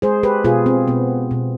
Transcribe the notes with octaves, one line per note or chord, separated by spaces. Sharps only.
G#3 G#4 C5
G4 B4
B2 F4 G#4
C4
B2 B3
B2